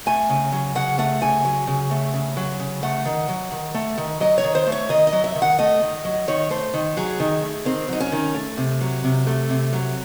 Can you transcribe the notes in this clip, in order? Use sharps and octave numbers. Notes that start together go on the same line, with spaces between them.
A3 G#5
C#3
F#3
C#3 F#5
A3 F#5
C#3 G#5
F#3
C#3
A3
C#3
F#3
C#3
A3 F#5
D#3
F#3
D#3
A3
D#3
F#3 D#5
C#5
D#3
C5
A3
C#5
D#3 D#5
D#5
F#3
E5
D#3
F#5
A3 D#5
D#3
F#3
D#3 C#5
A3 C5
D#3
F#3 G#4
D#3
A3
D#3 C4
F#3 D#4
C#4
D#3
A3
C3
F#3
C3
A3
C3
F#3